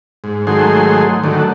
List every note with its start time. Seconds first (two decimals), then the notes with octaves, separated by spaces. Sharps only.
0.24 G#2
0.47 G#2 D#3 F#3 A3 G#4 C6
1.24 D3 D#3 F#3 A3